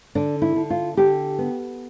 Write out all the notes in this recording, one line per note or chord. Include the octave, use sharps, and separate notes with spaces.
D3 D4
E4
D3
F4
D3 G4
B3